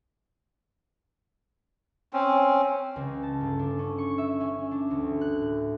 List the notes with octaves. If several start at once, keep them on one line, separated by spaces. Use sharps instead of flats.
C4 C#4
C#2
A5
G1
D4
C#4
C#6
E5
C#4
D4
D2
F#6
A2